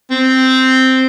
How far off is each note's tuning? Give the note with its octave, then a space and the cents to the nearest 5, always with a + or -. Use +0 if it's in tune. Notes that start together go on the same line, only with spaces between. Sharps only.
C4 -5